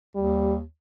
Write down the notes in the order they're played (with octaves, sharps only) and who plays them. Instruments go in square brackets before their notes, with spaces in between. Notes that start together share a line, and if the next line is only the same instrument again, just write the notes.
[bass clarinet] D#2 [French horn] G3